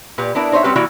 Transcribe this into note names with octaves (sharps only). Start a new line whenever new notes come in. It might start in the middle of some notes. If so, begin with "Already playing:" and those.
A#2 G4 B4
B3 D4 E4 A#4
D#4 C5 C#5 D#5 E5
G3 C4 C#4 F#4 G4 B4
E3 G3 A#3 E4 F#4 D5